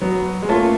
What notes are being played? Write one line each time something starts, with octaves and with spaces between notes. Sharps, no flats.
F#3 B3
G#3
A3 A#3 C#4 F4 A4